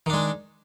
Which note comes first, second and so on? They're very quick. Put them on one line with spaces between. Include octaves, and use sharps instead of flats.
D#3 D4 G#3